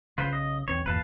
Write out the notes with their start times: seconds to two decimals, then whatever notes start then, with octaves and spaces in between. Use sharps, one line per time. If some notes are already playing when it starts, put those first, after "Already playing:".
0.18 B1 C#3 F4 B4 C5
0.33 D#5
0.68 B1 E2 C4 C#5
0.86 G1 E2 A#2 B4 F5 A5